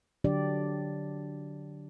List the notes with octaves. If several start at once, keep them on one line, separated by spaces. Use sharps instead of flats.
D3 F#3 D4 G4 D5